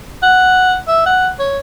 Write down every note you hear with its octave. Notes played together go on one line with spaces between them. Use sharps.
F#5
E5
F#5
C#5